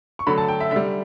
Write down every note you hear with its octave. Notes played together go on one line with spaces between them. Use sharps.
C#6
D3 F#3 A3 B5
A5
G5
E5
D3 G3 E5